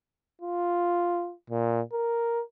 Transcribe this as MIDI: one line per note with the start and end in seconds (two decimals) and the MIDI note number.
0.41 1.33 65
1.50 1.81 46
1.93 2.41 70